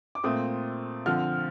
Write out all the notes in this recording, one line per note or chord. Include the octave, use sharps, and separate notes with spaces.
D6
A#2 A3 C4 D#6
D3 F3 C4 F6